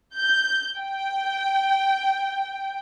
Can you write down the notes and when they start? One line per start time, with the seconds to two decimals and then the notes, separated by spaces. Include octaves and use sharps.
0.16 G6
0.79 G5